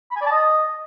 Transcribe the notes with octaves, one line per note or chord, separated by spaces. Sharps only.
B5
G#5
D5
A5
D#5